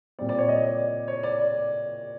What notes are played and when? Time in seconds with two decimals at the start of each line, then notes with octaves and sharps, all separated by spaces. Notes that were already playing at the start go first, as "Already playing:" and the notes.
0.19 A#2 G3 C4 D5
0.29 D5
0.38 C#5
0.49 D#5
0.64 D5
1.08 C#5
1.23 D5